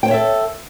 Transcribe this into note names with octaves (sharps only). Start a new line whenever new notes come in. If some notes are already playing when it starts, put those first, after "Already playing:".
A4 C5 C#5 E5 G5